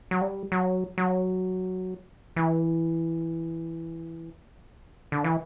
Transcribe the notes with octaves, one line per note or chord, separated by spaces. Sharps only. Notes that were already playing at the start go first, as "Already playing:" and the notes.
F#3
G3
F#3
F#3
E3
D3
E3